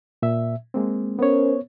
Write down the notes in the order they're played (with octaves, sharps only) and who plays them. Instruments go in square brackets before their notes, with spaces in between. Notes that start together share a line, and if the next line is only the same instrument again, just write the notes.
[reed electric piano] A#2 E5
G#3 A#3 C4
[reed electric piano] B3 C#5 [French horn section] C#4 A#4 C5